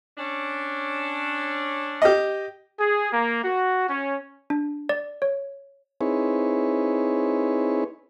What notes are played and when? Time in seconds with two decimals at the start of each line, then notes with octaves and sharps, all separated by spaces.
0.17 C#4 D4
2.02 G4 D#5
2.79 G#4
3.13 A#3
3.43 F#4
3.88 C#4
4.50 D4
4.89 D5
5.22 C#5
6.01 C4 D#4 E4 G#4 B4 C#5